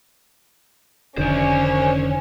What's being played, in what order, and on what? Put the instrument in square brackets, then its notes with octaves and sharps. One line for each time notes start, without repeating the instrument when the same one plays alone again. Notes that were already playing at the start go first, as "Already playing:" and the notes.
[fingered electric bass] F1 D3 D#3 [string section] C#4 [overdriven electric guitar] C5 D5